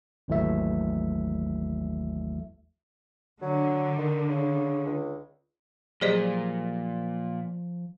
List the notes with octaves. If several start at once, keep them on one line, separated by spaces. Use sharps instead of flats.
G#1 D#2 E3 F#3 A3 E5
D3 F#3
D#3
C#3
C#2
A#2 F3 F#3 G4 G#4 C5 D5 D#5